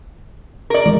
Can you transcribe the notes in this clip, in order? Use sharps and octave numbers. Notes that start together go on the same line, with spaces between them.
A#4 D5
E3 G#3